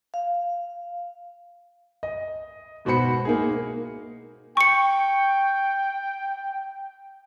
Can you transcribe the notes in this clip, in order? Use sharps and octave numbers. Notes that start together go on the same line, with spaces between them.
F5
D#5
G#2 B2 F#4 C5 B5 C#7
A#3 D#4 G#4
G5 C#6 C#7